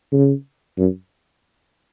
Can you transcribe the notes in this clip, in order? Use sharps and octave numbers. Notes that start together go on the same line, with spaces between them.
C#3
F#2